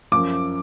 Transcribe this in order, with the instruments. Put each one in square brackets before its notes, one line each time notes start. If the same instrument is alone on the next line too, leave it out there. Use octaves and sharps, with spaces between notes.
[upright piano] F#2 F3 D6